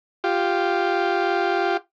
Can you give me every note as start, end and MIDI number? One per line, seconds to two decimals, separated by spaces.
0.24 1.77 65
0.24 1.77 67